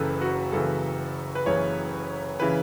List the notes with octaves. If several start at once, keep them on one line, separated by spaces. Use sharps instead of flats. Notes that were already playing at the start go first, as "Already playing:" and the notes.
Already playing: F#1 F#2 C#3 E3 A4 B4
F#4
F#1 F#2 C#3 E3 A4
B4
F#1 F#2 C#3 E3 C#5
C#3 E3 B4